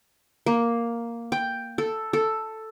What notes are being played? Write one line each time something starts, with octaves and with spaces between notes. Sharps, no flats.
A#3
G5
A4
A4